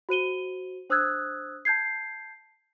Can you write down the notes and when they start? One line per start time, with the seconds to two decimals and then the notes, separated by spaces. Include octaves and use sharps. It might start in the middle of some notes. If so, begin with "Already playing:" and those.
0.09 F#4 C5 D#7 G7
0.90 D4 C5 D#6 E6 F#6 G#6
1.65 A5 G6 G#6 C7